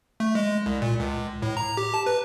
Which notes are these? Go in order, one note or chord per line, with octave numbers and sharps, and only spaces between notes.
A3
G#3
C2
A#2
C#2
A2
A#5
G4
A5
B4